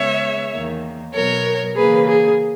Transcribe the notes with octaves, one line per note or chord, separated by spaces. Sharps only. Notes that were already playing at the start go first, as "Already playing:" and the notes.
Already playing: C#3 G#3 B3 C#5 E5
E2 D#3 A#3
B2 F#3 B3 A#4 C#5
C#3 E3 A#3 G#4 B4
G#4